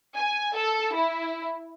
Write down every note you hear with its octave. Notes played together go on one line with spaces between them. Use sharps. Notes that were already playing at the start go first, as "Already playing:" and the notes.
G#5
A4
E4